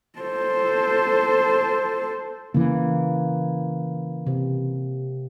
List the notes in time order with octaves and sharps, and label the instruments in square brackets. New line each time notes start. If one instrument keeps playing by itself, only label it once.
[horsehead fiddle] A4 C5
[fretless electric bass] C#3 E3 [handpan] A#3
[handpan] C3